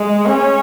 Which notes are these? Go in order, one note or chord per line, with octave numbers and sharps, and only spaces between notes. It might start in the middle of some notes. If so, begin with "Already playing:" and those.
Already playing: G#3
C#4